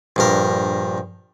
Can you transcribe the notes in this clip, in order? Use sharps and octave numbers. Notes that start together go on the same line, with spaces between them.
A#1 G2 A#4